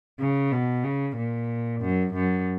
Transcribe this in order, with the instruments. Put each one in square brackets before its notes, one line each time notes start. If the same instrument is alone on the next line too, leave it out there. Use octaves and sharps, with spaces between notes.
[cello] C#3
B2
C#3
A#2
F#2
F#2